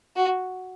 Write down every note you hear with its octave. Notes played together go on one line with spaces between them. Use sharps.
F#4